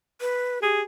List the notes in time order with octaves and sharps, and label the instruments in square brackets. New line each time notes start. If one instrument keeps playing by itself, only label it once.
[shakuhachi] B4
[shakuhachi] G4 [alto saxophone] G#4